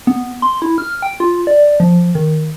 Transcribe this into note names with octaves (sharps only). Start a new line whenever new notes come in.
B3
C6
E4
F6
G5
F4
D5
F3
D#3